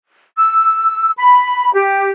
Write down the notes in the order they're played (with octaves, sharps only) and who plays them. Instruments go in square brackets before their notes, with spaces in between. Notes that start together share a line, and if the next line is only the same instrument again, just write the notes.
[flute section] E6
B5
G4